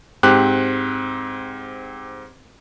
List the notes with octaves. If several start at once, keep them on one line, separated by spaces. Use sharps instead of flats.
G#2 C4 G4 F#6